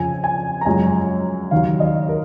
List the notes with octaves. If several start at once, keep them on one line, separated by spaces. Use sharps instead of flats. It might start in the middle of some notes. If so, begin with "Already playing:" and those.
Already playing: F2 C#3 F3 G#5
G#5
A#5
F#2 F3 G#3 G#5
D#2 D#3 F#3 F5
D#5
A#4